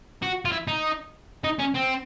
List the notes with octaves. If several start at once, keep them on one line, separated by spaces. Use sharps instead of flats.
F#4
F4
E4
D#4
D#4
C#4
C4